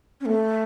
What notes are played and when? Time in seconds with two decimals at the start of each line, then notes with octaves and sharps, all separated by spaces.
0.21 C#4
0.26 A3